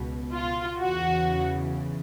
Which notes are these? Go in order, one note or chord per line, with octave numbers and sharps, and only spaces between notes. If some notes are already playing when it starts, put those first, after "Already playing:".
Already playing: C#2 B2
F4
E2 C#3 E3 F#4